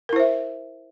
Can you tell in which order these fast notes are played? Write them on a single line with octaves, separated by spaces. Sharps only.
A#4 E4 C5 E5